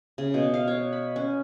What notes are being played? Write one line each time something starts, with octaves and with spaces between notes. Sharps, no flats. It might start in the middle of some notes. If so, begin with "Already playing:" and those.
C#3
B2
F5
C#5
B5
C#4